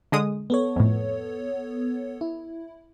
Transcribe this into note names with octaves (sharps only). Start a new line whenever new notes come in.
D3 G#3 D#6
B3 A4 C#5
F2 A2
E4